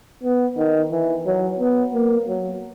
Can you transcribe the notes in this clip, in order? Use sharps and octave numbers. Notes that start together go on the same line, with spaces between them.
B3
D#3
E3
F#3
B3
A#3
F#3